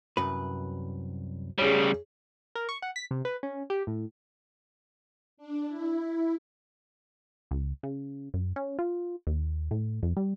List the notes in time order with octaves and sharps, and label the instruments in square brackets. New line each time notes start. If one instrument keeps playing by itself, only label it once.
[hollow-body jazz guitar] C2 F#2 B4
[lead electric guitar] C#3 G3 [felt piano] G#4 C#5
[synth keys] A#4
C#6
F#5
B6
C3
B4
C#4
G4
A2
[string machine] D4
E4
[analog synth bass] C#2
C#3
F#2
C#4
F4
D#2
A2
F2
G3